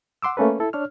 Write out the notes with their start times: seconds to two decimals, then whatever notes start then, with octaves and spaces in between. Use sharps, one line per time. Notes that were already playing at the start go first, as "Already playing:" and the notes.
0.22 F#5 C6 D6 E6
0.37 A3 A#3 C#4 A4 B4
0.60 E4 A4
0.73 D4 C#5 F6